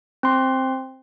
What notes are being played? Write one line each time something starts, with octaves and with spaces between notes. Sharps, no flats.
C4 C6